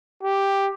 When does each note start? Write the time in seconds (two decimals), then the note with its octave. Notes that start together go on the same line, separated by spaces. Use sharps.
0.23 G4